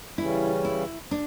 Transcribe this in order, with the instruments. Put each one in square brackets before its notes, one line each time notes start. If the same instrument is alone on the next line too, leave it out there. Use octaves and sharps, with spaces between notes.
[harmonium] C#3 E3 G3 C#4 [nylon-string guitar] E4
[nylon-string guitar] E4
D4